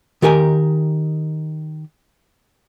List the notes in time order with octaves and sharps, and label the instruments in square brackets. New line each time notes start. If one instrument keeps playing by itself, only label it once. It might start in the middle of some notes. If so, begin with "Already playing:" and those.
[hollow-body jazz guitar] D#3 G4 A#4 G#5